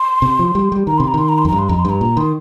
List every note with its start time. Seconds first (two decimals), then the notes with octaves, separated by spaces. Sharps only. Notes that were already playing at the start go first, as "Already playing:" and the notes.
Already playing: C6
0.22 C3
0.39 F3
0.55 G3
0.72 G3
0.87 D#3 A#5
0.98 C3 C6
1.08 A#5
1.14 D#3 C6
1.29 A#5
1.38 C6
1.45 F2
1.48 G2 A#5
1.59 C6
1.69 F2 A#5
1.79 C6
1.85 G2 A#5
2.01 A#2
2.17 D#3 C6